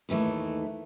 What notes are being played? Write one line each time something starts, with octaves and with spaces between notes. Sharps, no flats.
D#2 D#3 E3 A3